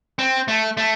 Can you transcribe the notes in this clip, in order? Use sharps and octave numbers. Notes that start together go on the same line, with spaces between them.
C4
A3
A3